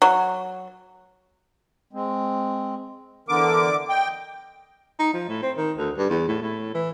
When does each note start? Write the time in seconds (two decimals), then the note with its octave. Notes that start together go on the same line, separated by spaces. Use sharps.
0.02 F#3
1.93 G#3 C4
3.29 D3 E3 B3 A#4 D6
3.89 D#5 G5
4.99 D#4
5.14 F3
5.29 A2
5.42 C4
5.57 D#3
5.78 D2
5.98 G2
6.10 E2
6.28 A2
6.42 A2
6.74 E3